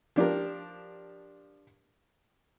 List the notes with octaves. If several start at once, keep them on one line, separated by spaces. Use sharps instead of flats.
F3 D4 G4 A#4